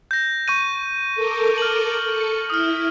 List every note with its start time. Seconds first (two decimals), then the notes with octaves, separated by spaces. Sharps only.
0.11 G6 A#6
0.48 C#6 G6 D#7
1.15 A4 A#4 D6
1.58 F6 F#7
2.05 A4 C#7
2.50 E4 D#6 F6